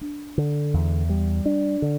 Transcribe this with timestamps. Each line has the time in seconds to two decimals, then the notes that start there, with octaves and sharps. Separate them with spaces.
0.01 D4
0.38 D3
0.74 E2
1.09 G3
1.46 D4
1.82 D3